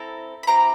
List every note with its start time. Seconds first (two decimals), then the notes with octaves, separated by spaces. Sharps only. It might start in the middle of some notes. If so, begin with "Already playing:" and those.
Already playing: C4 E4 A4 A#5
0.43 B5
0.47 C4 E4 G4 A#5